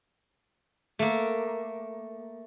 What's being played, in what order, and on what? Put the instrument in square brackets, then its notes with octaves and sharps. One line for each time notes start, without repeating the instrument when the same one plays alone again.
[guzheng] A3 A#3